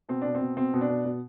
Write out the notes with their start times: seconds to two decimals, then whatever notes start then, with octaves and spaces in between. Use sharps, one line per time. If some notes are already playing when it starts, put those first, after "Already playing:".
0.08 B2 C4
0.22 B2 D4
0.35 C4
0.41 B2
0.56 B2 C4
0.73 B2
0.81 D4
0.90 B2
1.05 B2